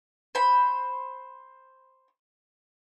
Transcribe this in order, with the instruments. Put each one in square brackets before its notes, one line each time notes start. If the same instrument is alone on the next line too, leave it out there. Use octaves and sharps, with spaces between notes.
[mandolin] C5 B5